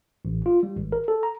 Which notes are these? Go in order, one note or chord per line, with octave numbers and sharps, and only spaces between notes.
A1
F4
G3
G#1
A#4
A4
A#5